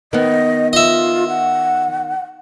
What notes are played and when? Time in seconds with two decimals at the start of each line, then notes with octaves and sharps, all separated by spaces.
0.13 D#3 B3 D#5
0.73 F4 D#5 E5
1.29 F#5